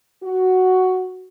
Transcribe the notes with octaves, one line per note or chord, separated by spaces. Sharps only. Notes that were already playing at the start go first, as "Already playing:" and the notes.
F#4